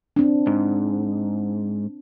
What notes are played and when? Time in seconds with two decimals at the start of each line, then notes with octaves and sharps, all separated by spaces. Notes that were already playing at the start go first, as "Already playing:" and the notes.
0.16 C4 D4
0.47 G#2